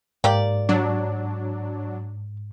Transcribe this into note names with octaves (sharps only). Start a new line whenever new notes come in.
G#2 A#3 G4 D5
F#3 D4